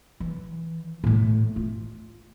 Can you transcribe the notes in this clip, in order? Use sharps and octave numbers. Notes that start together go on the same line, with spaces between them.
E3
A2 A3
F4